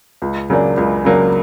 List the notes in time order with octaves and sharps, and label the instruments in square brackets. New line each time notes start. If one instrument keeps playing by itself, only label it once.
[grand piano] C#2
C#3 F#3 A#3 D4
C#2
C#3 F#3 A#3 D4